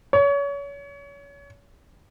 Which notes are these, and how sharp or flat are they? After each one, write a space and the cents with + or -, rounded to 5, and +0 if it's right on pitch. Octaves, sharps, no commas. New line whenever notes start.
C#5 +30